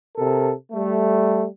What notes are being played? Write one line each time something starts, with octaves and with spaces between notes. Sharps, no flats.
C3 A4 A#4
G3 A3